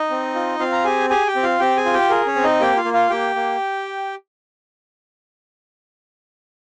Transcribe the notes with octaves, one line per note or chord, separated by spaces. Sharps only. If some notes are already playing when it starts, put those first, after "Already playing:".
Already playing: D#4 D#5
C4
F4
C4 F4 F5
A#5
G4 G#4 G#5
G4 G#4 G#5
G4 G5
C4
F4 F5
C4 G4 G5
G#4 G#5
F4
G4 G5
G#4 A#4
C#4 C#5
C4
D#4 D#5
A#3 G4 G5
F4 F5
A#3
F4 F5
A#3 G4 G5
A#3